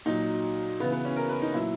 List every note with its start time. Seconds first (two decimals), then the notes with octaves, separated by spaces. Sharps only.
0.06 A#2 F#3 D#4
0.80 C#3 B3
0.84 E3
0.92 B3
1.05 C#4
1.16 A#4
1.29 B4
1.42 D#4
1.53 A#2 F#3 E4